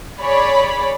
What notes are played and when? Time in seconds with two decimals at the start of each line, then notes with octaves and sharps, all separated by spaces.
0.20 G#4 C#5 D5 B5